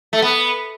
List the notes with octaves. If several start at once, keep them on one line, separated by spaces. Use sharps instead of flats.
A3
B3